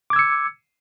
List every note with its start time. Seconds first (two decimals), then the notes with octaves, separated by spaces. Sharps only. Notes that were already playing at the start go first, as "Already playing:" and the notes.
0.10 D6
0.13 G#6
0.16 E6
0.19 C#7